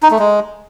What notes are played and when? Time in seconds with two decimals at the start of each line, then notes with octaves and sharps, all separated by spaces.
0.03 D#4
0.11 A3
0.19 G#3